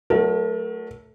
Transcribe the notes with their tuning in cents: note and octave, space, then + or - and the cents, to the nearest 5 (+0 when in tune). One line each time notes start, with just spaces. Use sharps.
F#3 +0 A3 +0 A#4 +30